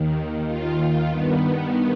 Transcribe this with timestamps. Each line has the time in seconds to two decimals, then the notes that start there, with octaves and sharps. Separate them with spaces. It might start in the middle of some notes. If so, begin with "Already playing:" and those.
Already playing: D#2 D#3
0.47 F4
1.08 G2 D#3 B3